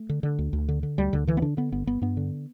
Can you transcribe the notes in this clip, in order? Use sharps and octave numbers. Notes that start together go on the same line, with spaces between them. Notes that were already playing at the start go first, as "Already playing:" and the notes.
Already playing: A3
D3
D3
D2
D2
D3
D3
D2 G3
D2 D3
D3 E3
B3
D3 D4
D3 B3
G1 B3
G1 B3
G2 B3
D3